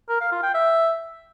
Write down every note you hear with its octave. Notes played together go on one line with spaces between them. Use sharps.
A#4
F5
F4
G5
E5